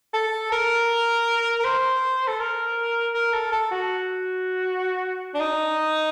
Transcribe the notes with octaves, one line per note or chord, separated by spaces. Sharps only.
A4
A#4
A#4
C5
A4
A#4
A#4
A4
A4
F#4
D4
D#4